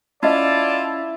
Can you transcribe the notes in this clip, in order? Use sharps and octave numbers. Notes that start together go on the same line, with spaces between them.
C#4 E4 F4 D5 D#5 A5